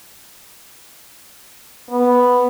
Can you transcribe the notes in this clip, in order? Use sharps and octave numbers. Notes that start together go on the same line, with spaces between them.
B3